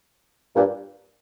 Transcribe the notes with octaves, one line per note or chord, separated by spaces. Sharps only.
G2 A#2